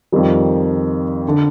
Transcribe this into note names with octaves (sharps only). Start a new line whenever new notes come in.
F2 D#3 G3
D3